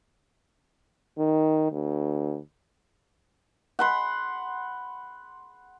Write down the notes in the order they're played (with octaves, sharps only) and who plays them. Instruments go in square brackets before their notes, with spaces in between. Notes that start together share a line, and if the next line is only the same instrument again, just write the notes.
[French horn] D#3
D2
[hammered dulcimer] F#5 B5 C6